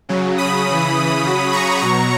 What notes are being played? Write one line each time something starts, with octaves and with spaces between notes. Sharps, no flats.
C#3 F#3
B5 D#6
C#3 E3
C#3 F#3
A#5 C#6
B2 F#3 A#5 C#6